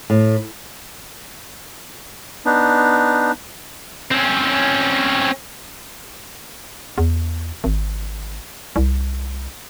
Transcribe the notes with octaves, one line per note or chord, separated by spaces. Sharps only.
A2
B3 D4 D#4
C4 C#4
E2
G#1
C2